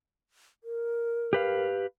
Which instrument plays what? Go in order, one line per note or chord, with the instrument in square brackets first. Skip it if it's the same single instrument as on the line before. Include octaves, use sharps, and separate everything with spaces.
[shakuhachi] A#4
[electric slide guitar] G4 B4 F5